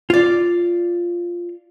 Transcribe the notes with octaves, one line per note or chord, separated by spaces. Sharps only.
F4 D5